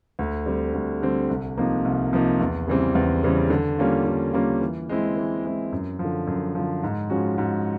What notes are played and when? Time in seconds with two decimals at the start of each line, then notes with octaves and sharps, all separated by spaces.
0.19 D2
0.46 D3 G3 C4
0.74 D2
1.02 D3 G3 C4
1.29 C2
1.58 C3 F3 A#3 D#4
1.85 C2
2.13 C3 F3 A#3 D#4
2.40 E2
2.67 C#3 E3 G3 C4
2.95 E2
3.24 C#3 E3 G3 C4
3.50 D3
3.79 G3 A#3 C#4 F4
4.07 D3
4.33 G3 A#3 C#4 F4
4.61 E3
4.89 G#3 C4 E4
5.16 E3
5.45 G#3 C4 E4
5.73 F#2
5.99 F3
6.05 D3
6.27 F#2
6.55 D3 F3
6.83 G#2
7.10 F3 G#3 C#4 F#4
7.38 G#2